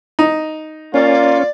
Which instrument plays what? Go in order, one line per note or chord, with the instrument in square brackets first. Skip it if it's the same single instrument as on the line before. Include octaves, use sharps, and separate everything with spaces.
[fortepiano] D#4
[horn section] A#3 F4 [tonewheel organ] C#4 [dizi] D5